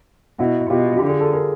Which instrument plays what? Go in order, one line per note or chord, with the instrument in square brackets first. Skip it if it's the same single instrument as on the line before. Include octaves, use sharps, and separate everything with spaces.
[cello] B2 [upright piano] E4 F#4
[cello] B2 [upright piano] F4 G4
[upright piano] G4
[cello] D3
[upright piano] G#4
A4
G#4 A#4